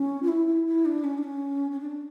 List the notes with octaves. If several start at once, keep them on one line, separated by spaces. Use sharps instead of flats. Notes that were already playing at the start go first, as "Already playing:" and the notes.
Already playing: C#4
F4
E4
E4
E4
D4
C#4
D4
C#4
C#4
D4